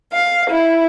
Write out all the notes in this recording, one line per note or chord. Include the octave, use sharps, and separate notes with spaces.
F5
E4